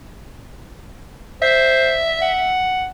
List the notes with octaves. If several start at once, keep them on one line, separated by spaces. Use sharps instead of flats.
C5 E5
F#5